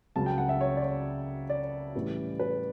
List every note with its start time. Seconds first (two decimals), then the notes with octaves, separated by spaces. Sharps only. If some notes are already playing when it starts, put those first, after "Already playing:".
0.15 C#2 C#3 F#3 A5
0.26 G5
0.38 F#5
0.49 E5
0.61 C#5
0.77 D5
0.82 C#5
1.50 D5
1.95 A2 E3 G3 C#4
2.40 B4